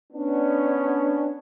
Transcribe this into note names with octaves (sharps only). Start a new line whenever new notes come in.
B3 C#4 D4